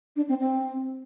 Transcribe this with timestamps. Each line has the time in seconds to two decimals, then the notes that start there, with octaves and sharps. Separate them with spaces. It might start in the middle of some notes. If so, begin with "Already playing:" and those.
0.16 D4
0.29 C4
0.40 C4